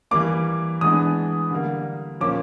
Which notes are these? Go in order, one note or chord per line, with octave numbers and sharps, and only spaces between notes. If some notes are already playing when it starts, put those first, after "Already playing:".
E3 G3 A#3 D6
E3 G#3 B3 D4 D#6
D3 G3 A#3
A#2 F3 A#3 C#4 D6